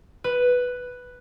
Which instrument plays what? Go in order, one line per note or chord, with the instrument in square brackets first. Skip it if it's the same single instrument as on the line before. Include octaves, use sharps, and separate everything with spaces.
[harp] B4